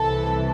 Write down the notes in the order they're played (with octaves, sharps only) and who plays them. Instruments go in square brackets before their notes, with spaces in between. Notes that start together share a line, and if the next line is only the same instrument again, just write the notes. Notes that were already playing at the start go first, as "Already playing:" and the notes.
Already playing: [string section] C2 C3 E3 A4